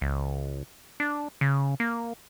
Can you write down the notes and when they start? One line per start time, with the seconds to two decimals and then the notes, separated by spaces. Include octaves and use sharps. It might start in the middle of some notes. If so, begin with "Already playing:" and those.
0.01 C#2
1.00 D4
1.41 C#3
1.80 A#3